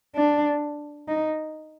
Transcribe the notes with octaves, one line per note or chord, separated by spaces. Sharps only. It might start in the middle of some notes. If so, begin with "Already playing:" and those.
D4
D#4